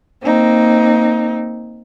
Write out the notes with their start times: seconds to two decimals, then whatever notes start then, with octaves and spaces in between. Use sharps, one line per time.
0.22 A#3 C4 D#4